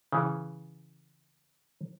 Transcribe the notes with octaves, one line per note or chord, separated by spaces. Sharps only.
C#3 E3